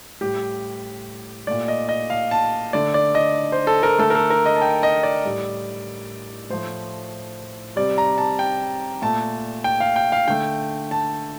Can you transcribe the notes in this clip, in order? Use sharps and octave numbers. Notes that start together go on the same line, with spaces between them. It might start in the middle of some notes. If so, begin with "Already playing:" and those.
A2 G3 G4
A#2 A3 D5
D#5
D#5
F5
A5
D3 A3 D5
D5
D#5
C5
A4
A#4
D3 A3 A4
A#4
A4
A#4
D#5
A5
G5
D#5
D5
A2 G3
A2 F3 A3 C5
C3 G3 D5
A#5
A5
G5
A#2 A3 A5
G5
F5
G5
F5
D3 A3 G5
A5